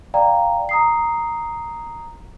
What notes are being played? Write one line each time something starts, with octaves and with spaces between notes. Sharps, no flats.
D5 F5 G5 A#5
A#5 D#6 C7